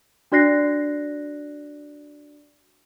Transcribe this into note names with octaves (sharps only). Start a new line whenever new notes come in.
D4 F#4 D5 F#6 A#6 C7